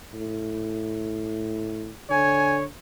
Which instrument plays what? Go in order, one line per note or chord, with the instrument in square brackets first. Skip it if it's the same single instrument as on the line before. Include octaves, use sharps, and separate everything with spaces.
[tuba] A2
[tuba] D3 [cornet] C#5 [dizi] G#5